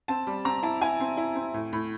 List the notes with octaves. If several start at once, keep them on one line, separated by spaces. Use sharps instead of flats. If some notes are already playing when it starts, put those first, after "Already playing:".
C4 A5
G3
C4 A#5
E4 A5
E4 G#5
C4
E4
C4
A2
A2